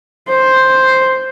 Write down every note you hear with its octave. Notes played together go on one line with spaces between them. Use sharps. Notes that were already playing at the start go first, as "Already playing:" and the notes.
C5